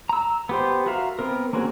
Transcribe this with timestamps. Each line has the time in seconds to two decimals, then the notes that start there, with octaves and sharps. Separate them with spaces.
0.09 A#5 E6
0.49 B3 G4 C5
0.86 F#4 A#4 E5 F5
1.19 B3 C4 A#4
1.53 A#3 C4 C#4 F#4 G#4